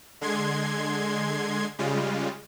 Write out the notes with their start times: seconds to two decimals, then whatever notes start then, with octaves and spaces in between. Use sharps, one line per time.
0.21 D3 G#3 C6 G#6
1.79 C#3 G3 G#3 F4